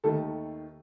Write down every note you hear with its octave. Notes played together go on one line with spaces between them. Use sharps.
D#2 D#3 A3 A4